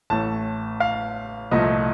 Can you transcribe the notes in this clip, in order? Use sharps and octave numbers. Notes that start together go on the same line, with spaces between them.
A1 A2 A3 A5
F5
C2 A#2 F3 A3 D#5